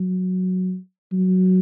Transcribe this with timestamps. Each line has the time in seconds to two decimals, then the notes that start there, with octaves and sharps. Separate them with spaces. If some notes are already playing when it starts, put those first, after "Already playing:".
Already playing: F#3
1.12 F#3